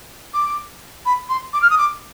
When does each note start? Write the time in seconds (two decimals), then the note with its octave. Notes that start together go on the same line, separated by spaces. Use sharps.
0.33 D6
1.05 B5
1.29 C6
1.53 D6
1.62 F6
1.70 D#6
1.77 D6